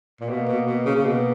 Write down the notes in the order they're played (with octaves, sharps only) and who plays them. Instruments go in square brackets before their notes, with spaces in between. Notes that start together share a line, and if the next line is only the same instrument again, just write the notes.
[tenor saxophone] A#2
[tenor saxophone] B2 [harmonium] A#3
[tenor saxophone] B2
B2
C#3
C#3
B2